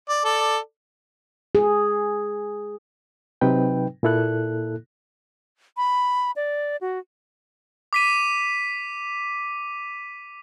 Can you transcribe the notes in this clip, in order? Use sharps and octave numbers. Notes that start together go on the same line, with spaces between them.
D5
A4 D5
G#4
C3 F#3 C4 D#4 B4 G5
A#2 A#3 E4 A4 F#6
B5
D5
F#4
D6 B6 D#7